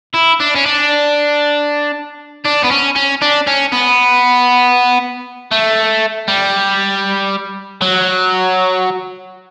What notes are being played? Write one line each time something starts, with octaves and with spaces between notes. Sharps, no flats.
E4
D4
C#4
D4
D4
B3
C#4
C#4
D4
C#4
B3
A3
G3
F#3